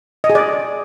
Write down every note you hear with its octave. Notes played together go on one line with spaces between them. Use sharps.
D#5
G#4
D5